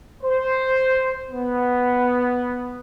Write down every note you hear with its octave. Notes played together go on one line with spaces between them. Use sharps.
C5
B3